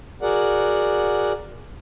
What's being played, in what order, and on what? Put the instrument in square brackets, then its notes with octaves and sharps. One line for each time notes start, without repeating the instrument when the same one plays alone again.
[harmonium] F#4 G#4 A#4 D5 F#5